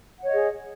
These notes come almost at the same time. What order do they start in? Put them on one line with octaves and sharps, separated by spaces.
F#5 C#5 D#5 G#4